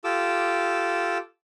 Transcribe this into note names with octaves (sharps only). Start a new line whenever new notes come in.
F4 G4 A4 D6 E6